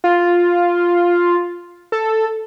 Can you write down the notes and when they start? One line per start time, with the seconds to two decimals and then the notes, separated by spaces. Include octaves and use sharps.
0.04 F4
1.92 A4